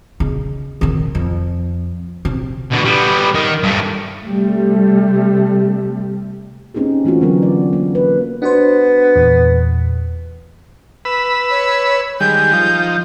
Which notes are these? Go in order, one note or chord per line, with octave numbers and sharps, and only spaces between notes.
C#3 D#4
C3 D#3
F2
C3
B2 D3
G3 B3
D#3
G2 A3
C3 G3 A3
A#3 C4 C#4 D#4 G4 G#4
E3 A3 C4 F4 F#4
D3 F#3 B3 A#4
D5
A#3
B4
B3 D4 F#4 C5
E2 A#2
B4 B5 E6
C#5
D#3 G3 G#3 G6
F3 D#4